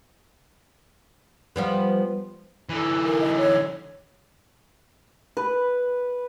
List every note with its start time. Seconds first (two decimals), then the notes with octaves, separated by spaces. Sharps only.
1.56 F3 G3 B3
2.69 D3 E3
3.06 A#4
3.21 D#5
3.37 C#5
5.37 B4